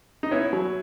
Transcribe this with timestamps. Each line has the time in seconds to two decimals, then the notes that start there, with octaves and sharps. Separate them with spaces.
0.23 D#4
0.31 B3 C#4 E4
0.53 F#3